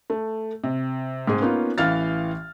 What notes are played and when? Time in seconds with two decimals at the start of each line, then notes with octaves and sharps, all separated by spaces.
0.10 A3
0.64 C3
1.27 G#2 C4 G#4
1.41 A#3 B3 C#4 D#4 F4
1.78 A1 E3 F5 F6 A6